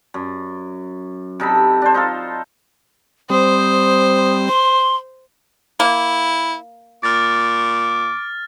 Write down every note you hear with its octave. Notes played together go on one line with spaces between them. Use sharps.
F#2
C3 D#4 A4 B5
D4 C5
D#4 F4 A4
G3 C4 C5 D#6
C6
A#3 E4
A#2 D6 F6 A6